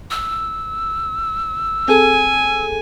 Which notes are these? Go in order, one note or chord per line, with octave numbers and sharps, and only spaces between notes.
E6
C4 G#4 A4 G#5